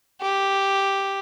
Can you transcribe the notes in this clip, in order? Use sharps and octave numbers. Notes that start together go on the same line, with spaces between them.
G4